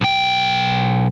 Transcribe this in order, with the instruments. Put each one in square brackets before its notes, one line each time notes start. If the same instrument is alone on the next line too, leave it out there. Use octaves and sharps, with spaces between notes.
[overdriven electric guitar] B1 G5